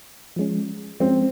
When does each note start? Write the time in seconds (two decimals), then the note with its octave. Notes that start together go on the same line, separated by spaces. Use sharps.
0.36 F3 G#3 C#4
1.00 F3 G#3 C4 C#4